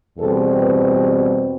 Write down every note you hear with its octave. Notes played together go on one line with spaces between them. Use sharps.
E2 B2 G3 C4 A4
B4